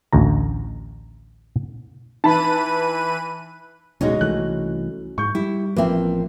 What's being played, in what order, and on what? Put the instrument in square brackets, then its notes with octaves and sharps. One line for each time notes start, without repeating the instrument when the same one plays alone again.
[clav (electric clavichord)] A1 D2 A#5
[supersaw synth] E3 B4 D#7 [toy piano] D#4 [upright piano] A5 B5
[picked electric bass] D1 [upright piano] B2 G#3 [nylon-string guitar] C#4 D#4 F#4
[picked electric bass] C2 E3 A3 [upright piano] F#6
[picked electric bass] G#2 [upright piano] C#6 G6
[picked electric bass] G3 [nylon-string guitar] E4
[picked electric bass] A1 F3 [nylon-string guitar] A#3 C4 [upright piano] B4 E5